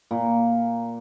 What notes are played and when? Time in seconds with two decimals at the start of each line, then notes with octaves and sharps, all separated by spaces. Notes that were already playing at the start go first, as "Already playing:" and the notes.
0.11 A#2